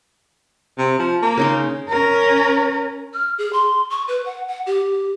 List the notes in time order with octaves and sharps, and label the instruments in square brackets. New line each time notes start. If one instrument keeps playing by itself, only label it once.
[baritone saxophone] C3
F3
A#3
[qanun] C#3 D#4 C6
[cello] C#4 A#4
[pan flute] F6
G#4
C6
C#6
B4
F#5
F#5
G4